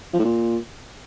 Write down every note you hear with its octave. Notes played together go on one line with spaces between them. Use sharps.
F3
A2
A#2